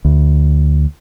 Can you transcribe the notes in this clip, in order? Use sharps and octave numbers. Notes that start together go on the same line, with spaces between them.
D2